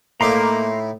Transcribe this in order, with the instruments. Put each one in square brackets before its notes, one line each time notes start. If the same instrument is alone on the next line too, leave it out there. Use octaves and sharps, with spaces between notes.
[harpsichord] A2 D#4 E4 [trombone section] A#3 [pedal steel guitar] A#5 C6 D6